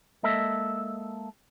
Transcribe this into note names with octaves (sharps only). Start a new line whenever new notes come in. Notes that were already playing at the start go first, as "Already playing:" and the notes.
G#3 A#3 A4 D#5 E5